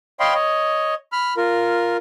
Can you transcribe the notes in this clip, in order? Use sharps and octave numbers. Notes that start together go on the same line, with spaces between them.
C#5 D#5 F5 G5 B5 C6
C#5 D#5
B5 F6
F4 A#4